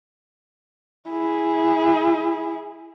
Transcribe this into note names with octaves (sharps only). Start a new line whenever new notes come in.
E4 G#4